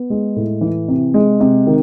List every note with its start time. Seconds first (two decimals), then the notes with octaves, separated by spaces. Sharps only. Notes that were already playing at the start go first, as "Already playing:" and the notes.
Already playing: B3
0.10 G#3
0.36 A2
0.61 E3
0.88 C3
1.14 G#3
1.40 C3
1.67 D#3